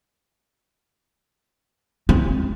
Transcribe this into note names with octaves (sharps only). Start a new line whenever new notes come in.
C4